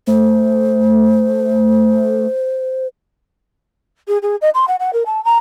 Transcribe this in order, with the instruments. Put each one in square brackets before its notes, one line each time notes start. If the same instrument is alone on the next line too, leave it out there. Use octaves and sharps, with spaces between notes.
[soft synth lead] A3 [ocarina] C5
[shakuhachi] G#4
G#4
D#5
C6
F#5
F#5
A#4
A5
A#5